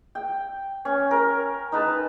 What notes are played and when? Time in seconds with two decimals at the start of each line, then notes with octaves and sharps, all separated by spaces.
0.15 G5
0.85 C#4
1.11 A#4
1.72 D#4 B4 A5